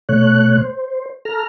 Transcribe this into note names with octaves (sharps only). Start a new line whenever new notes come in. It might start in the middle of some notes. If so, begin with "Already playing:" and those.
B2 A3 C#5 F#6
C5
A4 A#5 F6